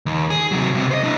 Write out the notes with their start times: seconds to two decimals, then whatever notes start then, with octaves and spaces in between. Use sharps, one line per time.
0.06 D#2
0.30 G#4
0.52 C3 F#3
0.74 B1 C3
0.91 C5 D#5
1.04 D4 E4